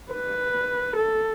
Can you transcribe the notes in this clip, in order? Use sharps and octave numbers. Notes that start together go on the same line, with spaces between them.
B4
A4